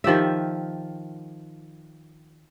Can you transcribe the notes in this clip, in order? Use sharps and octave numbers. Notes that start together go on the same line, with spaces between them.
D#3 F3 G4 E5